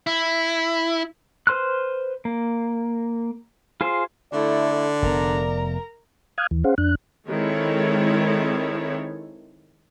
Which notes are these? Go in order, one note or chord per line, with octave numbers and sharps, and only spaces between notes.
E4
B4 C5 C6 F6 F#6
A#3
F4 G#4 C5
D3 A3 E4 D5
F1 B3 A#4 A#5
F5 D#6 F6 F#6 G#6
D#2 E3
C#4 G#4 C5 F5 F#5
F2 D4 F#6
D#3 G#3 C4 E4 A4 C#5